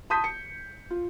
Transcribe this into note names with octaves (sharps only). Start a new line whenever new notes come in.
A5 C6 D#6 G6 B6
C#7
F4